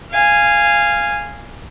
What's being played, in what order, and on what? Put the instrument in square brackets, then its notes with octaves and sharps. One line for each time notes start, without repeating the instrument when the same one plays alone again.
[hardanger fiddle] F5 G#5